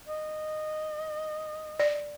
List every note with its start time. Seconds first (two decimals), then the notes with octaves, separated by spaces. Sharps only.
0.06 D#5
1.79 D5